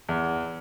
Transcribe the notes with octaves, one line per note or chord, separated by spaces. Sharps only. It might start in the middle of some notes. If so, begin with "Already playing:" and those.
E2